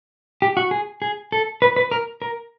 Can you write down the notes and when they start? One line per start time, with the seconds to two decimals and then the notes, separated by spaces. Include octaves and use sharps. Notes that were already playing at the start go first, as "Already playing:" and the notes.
0.42 G4
0.57 F#4
0.71 G#4
1.02 G#4
1.32 A4
1.62 B4
1.76 B4
1.91 A#4
2.22 A#4